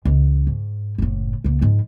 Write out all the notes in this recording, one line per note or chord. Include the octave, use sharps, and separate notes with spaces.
C#2 E3
G#2
F#1 A2
C#2 A#3
G#2 F3